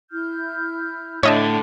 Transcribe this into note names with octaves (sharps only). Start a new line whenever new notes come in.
E4 F6 G6
A2 D3 D4 C#5 D#5 E5 D6